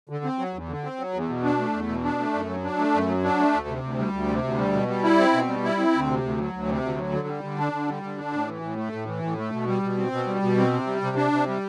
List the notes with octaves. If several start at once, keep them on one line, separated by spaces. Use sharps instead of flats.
D3
C4
F#3
E2
D3
C4
F#3
E2
B2
D4
A3
E2
B2
D4
A3
F#2
F#3
D4
A3
F#2
F#3
D4
A3
D2
C3
D2
G3
D2
C3
D2
G3
B2
G3
E4
C4
B2
G3
E4
C4
D2
C3
D2
F#3
D2
C3
D2
F#3
D3
G3
D3
D4
D3
G3
D3
D4
A2
E3
A2
A3
A2
E3
A2
A3
B2
G3
B2
C4
B2
G3
B2
C4
C3
G3
C3
D4
C3
G3